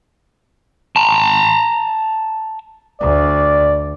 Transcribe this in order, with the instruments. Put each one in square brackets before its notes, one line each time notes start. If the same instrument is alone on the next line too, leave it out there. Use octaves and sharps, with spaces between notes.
[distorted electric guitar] A5 A#5
[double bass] D2 [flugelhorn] D5